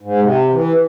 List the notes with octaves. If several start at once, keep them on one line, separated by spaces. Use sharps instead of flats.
G#2
C3
E3